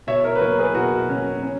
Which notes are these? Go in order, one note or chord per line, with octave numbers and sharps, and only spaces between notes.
B2 C#5 E5
A#4 C#5
B4
F#3 A#3 A#4 C#5
G#4 B4
B2 F#4 A#4
F#3 A#3 C#4
C#4